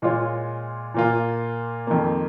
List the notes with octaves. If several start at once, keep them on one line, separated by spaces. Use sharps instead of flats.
A#2 G#3 F4 C#5
A#2 A#3 F4
F2 D#3 A#3